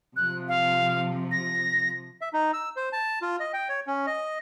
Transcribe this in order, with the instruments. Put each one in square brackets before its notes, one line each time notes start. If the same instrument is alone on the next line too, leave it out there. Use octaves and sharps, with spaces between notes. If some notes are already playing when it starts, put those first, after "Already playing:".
[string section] C3 F3 [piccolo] F#6
[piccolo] F5
A#6
[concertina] E5
D#4
E6
C5
A5
F4
D#5
G5
C#5
C#4
D#5